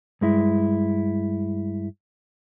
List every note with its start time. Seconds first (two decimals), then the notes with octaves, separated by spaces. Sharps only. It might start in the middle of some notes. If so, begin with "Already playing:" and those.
0.21 G2 G#3 E4